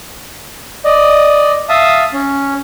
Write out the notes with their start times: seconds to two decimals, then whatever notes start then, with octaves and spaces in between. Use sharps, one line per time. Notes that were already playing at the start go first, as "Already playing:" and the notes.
0.85 D5 D#5
1.69 E5 F5 A5 D#6
2.13 C#4